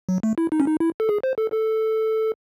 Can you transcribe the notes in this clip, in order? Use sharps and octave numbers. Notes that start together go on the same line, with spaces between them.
F#3
A3
E4
D#4
C#4
D#4
E4
A4
G#4
C5
A4
A4